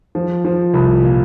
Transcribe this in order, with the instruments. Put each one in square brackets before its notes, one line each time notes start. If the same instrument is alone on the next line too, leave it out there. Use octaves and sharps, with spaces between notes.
[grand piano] F3
F3
C2
A#2